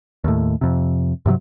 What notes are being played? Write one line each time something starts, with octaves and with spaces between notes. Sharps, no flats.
D#2 A2
F2 C3
G2 C3 E3 F#3